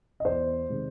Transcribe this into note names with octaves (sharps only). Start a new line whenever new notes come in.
D#5
E2 C5 D5
C3 D#3 G#3